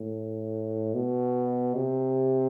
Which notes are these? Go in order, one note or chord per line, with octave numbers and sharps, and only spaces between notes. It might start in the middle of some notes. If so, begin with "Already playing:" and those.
Already playing: A2
B2
C3